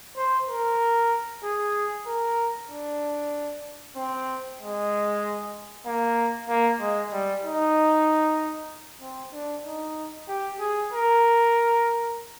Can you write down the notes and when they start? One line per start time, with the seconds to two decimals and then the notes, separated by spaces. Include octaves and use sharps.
0.17 C5
0.49 A#4
1.43 G#4
2.07 A#4
2.70 D4
3.96 C4
4.59 G#3
5.86 A#3
6.49 A#3
6.80 G#3
7.12 G3
7.44 D#4
9.01 C4
9.33 D4
9.64 D#4
10.28 G4
10.60 G#4
10.92 A#4